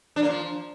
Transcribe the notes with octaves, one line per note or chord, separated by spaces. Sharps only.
D4
A#3
F3